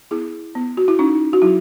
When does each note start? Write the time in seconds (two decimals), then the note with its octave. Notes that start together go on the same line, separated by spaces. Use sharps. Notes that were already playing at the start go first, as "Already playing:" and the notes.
0.11 B3 E4 G#4
0.55 B3
0.77 F#4
0.88 E4
0.99 C#4 D#4
1.33 F#4
1.42 F#3 E4